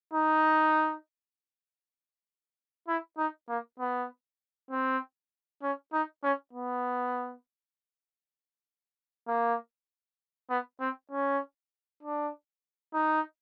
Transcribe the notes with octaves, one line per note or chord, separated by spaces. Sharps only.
D#4
E4
D#4
A#3
B3
C4
C#4
D#4
C#4
B3
A#3
B3
C4
C#4
D4
D#4